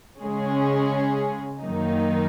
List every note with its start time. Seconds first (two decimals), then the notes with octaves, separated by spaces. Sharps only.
0.21 C#3 G#3 C#4 G#4
1.61 F#2 D#3 F#3 A#3 D#4